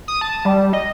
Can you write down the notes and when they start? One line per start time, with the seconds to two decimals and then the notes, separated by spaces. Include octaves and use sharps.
0.08 D#6
0.21 A5
0.45 G3
0.73 D#5